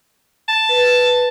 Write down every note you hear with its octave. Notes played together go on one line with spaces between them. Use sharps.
A5
B4